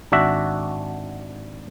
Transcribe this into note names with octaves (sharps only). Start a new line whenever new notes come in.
G#1 D4 F#4 E5